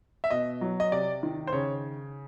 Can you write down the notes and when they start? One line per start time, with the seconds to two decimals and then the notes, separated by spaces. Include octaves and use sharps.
0.24 E5
0.30 B2 D#5
0.61 F#3
0.80 D#5
0.92 C3 D5
1.23 D#3
1.47 C5
1.52 C#3 C#5